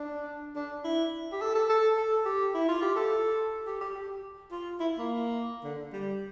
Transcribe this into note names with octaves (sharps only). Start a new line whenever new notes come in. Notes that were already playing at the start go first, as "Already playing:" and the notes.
Already playing: D4
D4
E4
G4
A4
A4
A4
A4
G4
E4
F4
G4
A4
G4
G4
G4
F4
E4
A#3
D3
G3